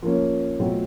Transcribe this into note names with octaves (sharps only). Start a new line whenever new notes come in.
F3 A#3 C#4
B2 F#3 A3 C4 F4